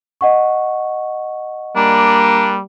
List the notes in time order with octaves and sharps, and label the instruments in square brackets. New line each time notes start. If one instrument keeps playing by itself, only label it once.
[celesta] D#5 F#5 C#6
[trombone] G3 [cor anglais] A#3 [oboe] D4